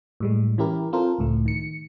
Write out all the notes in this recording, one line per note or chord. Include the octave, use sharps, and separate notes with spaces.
A2 G3 G#3
E3 C#4 E4 G4 A#4
C4 F4 A4 A#4 C5
C#2 A2 A3
D#3 C#7